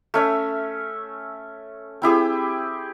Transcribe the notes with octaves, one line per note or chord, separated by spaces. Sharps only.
A3 C#4 E5
C4 E4 G4 G#4